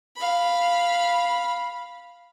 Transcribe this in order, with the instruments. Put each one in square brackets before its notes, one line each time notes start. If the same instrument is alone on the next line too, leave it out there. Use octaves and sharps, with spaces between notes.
[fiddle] F5 B5